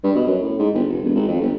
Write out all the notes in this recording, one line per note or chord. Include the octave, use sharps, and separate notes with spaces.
G2
B2
F#2
A2
G#2
G1
F1
E1
G#1
F2
G1